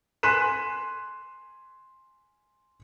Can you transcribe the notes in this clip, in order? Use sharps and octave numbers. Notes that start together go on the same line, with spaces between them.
G#5 C6 F#6 B6 D#7 E7